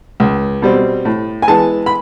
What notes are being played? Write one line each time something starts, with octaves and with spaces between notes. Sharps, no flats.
C#2
B2 G3 C4
A2
G#5
E3 G#3 B3 A5
B5